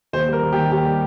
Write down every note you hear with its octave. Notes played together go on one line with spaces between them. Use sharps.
D#2 C5
G3 A#4
D#2
G4
D#3
D#2 G4
G3